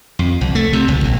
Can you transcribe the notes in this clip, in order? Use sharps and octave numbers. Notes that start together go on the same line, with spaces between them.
F2
C2
A3
C3
C#2
A#1